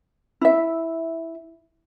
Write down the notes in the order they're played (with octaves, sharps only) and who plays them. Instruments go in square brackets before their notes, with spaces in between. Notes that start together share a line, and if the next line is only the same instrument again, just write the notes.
[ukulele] E4 E5